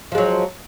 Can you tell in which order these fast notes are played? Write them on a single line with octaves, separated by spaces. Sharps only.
F3 G#3 F#3